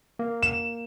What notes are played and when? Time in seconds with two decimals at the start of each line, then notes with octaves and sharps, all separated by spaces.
0.19 A#3
0.43 E7